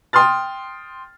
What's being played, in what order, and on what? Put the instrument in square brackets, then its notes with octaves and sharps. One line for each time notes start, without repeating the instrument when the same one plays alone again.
[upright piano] G5 C6 D#6 F6 A6